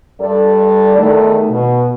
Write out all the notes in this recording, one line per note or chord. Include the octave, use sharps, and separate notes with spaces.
G2 G3 A4 D5
E2 D#3 A3
B2